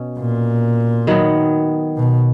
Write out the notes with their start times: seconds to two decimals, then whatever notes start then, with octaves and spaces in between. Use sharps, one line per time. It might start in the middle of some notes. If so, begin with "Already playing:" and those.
Already playing: B2 C#4
0.19 A#2
1.07 D#3 F#3 B3
1.97 B2